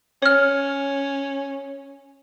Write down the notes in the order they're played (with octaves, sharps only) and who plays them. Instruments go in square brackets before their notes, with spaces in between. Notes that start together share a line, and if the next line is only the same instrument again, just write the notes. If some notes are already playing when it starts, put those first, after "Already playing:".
[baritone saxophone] C#4 [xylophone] C#5 F6